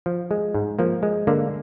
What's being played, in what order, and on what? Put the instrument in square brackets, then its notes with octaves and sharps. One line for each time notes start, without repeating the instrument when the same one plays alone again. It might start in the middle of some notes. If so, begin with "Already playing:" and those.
[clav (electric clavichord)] F3
G#3
G#2
F3 A#3
G#3
D3 A#3